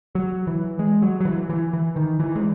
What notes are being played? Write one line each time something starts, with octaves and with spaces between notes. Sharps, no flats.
F#3
E3
G#3
F#3
F#3
E3
E3
E3
D#3
E3
G#3